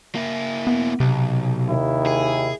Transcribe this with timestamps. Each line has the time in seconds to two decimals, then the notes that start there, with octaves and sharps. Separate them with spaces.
0.15 A#3 E4
0.67 B3
1.00 B1 C3
1.68 D#2 D#3 E4
2.07 G#4